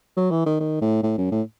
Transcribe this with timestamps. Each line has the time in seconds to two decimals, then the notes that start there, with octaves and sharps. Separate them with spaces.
0.17 F#3
0.31 E3
0.46 D#3
0.60 D#3
0.81 A2
1.03 A2
1.18 F#2
1.31 A2